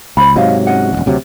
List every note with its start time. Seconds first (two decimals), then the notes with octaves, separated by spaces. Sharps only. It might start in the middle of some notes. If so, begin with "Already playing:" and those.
0.17 C#2 C5 B5
0.36 G#2 C3 F#3 D#5 F5
0.67 C#4 D#5 F#5
0.93 E1 B1
1.06 D2 C3 F#3